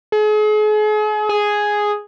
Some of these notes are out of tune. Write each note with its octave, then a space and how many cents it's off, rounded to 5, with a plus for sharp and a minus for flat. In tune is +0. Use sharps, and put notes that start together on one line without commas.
G#4 +40
G#4 +0